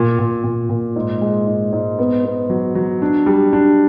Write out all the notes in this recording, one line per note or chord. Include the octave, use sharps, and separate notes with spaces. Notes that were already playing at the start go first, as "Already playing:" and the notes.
Already playing: A#2
A#2
A#2
A#2
G#2
G#3
G#2
G#2
B3
B3
F#3
F#3
D4
G3
D4